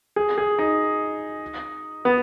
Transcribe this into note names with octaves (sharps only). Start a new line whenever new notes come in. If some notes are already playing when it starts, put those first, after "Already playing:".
G#4
G#4
D#4
B3